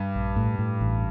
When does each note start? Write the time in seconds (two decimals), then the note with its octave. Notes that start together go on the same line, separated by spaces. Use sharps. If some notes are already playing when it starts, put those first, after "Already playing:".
Already playing: G2
0.15 A#1
0.36 A2
0.59 A2
0.81 A1